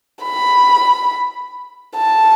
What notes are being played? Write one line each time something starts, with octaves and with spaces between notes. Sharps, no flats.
B5
A5